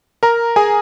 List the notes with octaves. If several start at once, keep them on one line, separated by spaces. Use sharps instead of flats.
A#4 A#5
G#4 G#5